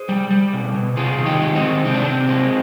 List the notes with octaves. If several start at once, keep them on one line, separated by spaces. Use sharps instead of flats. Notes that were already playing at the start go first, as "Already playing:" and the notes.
Already playing: G#4 C5
G3
G3
B2
B2
C3 F4 G#4
D#3
D#4 G4
G#3
C4 D#4
D#3
C3 C4
D4
C3 C4
G#3